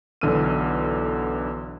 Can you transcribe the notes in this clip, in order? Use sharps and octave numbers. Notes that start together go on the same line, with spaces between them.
B1 D3 E3 E6 F6 D#7